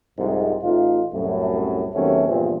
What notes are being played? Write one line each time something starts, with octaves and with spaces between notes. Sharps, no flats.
C2 F2 G#2
A1 A2 D#4 F4
C2 F#2 A2
D#2 C3 F#3 A3 B3 C#4
E2 G2 A#2 E3 F3 C4